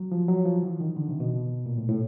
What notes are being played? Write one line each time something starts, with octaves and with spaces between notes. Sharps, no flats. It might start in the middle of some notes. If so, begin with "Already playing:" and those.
Already playing: F#3
F3
F#3
F3
E3
D#3
D3
C3
B2
A#2
A2
A2